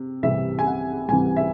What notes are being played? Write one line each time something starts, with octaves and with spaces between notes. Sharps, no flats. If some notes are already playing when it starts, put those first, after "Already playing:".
Already playing: C3
C2 C3 E3 E5
G#5
F#5
C2 C3 E3 G#5
E5